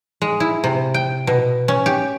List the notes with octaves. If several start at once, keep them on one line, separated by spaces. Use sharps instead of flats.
G#3
E4
C3
G5
B2
C#4
G4